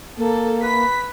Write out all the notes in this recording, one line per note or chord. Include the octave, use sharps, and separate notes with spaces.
A#3 A4
B4 B6